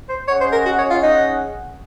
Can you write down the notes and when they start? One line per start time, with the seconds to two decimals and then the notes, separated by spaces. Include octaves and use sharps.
0.09 C5
0.28 C#4 G#4 C#5 D#5 F#5
0.41 C5
0.53 A#4
0.66 F#4
0.79 C#5
0.91 F4
1.03 D#4